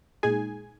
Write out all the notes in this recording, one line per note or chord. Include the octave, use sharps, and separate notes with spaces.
A#2 G#3 D#4 G#4 G#5